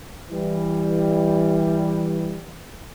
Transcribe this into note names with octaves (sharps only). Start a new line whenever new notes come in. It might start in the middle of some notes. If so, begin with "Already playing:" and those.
E3 G3